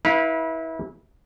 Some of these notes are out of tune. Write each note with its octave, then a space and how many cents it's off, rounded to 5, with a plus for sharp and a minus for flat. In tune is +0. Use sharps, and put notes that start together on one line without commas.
E4 -25 B4 -30 F5 +0